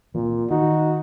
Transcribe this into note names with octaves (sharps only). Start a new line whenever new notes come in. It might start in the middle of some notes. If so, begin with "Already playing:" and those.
A#2 E3 C4
D#3 D#4 F#4